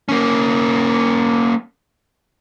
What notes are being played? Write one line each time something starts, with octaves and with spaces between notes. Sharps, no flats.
A#3 C#4